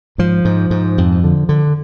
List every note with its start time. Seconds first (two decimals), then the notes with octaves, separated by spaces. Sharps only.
0.18 G#2 F3
0.45 G#2
0.71 G#2
0.98 F2
1.24 D3
1.49 D3